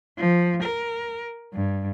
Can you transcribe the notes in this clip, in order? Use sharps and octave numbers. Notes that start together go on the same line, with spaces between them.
F3
A#4
G2